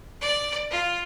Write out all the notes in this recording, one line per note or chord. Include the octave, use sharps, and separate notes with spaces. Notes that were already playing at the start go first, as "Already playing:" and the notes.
D5
F4